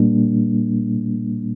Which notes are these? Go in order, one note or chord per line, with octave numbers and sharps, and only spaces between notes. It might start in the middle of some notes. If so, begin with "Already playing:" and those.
Already playing: A#2 G3 A#3 D4